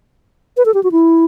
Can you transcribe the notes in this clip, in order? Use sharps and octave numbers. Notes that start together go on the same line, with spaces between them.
B4
A4
G4
F#4
E4